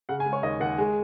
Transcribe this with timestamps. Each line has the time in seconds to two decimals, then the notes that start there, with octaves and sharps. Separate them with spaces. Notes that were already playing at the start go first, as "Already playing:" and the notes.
0.09 C#3 F#5
0.20 G#5
0.26 G#3
0.33 C#5
0.43 D#2 D#5
0.60 D#2 F#5
0.78 G#3 G#5